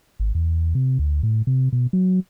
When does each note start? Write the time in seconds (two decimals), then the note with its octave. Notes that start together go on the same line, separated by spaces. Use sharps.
0.20 G#1
0.35 E2
0.75 C3
0.99 D2
1.23 A2
1.47 C3
1.73 B2
1.93 F#3